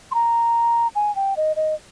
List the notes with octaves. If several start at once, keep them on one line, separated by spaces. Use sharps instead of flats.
C6
A#5
G#5
G5
D#5
D#5